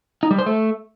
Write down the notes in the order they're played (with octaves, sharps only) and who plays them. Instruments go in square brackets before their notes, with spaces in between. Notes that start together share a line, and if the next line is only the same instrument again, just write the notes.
[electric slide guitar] D#4
G3
C5
A3